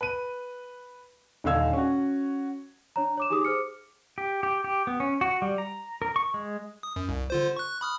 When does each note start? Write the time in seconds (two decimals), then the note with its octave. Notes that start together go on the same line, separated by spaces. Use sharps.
0.01 B4 D#7
1.44 D#1 D3 D#4 F5 E6 G#6
1.73 C#4 F#4
2.96 D4 C#5 A#5
3.17 C#5 D6 E7
3.30 D#4 G4 G#4 D6 D#6
3.45 G#4 C5 D6 F6 C#7
4.18 G4
4.43 G4
4.64 G4
4.87 B3
5.00 C#4
5.21 F#4
5.42 G3
5.58 A#5
6.02 A#4
6.16 C#6
6.34 G#3
6.83 D#6
6.96 F#2
7.09 C2
7.30 D3 F4 C5
7.56 C#6 F#6
7.81 B5 D#6 F6